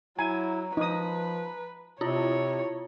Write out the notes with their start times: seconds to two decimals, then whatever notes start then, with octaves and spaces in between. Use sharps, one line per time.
0.19 F#3 E4 G#5 A#5
0.77 F3 D#4 B4 D#6
2.01 C3 E4 F4 C#5